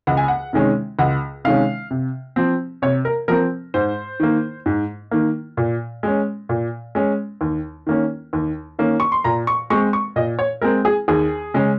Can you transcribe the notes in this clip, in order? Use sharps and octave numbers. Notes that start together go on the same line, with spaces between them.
C#2 F#5
G#5
F#5
C3 D#3 G#3 C#4
C#2 F#5
C3 D#3 G#3 C#4 F5
C3
F3 C4
C3 C#5
A#4
F3 C4 A#4
G#2 C5
D#3 A#3
G#2
D#3 A#3
A#2
G#3 C#4
A#2
G#3 C#4
D#2
D#3 A#3 C#4
D#2
D#3 A#3 C#4
C#6
C6
A#2 A#5
C#6
G#3 C4 C#6
C#6
A#2 D#5
C#5
G#3 C4 A#4
G#4
D#2 G#4
C#3 G#3 C#4